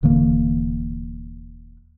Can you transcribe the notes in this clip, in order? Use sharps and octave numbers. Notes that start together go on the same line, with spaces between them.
D#1 D3 E3 A#3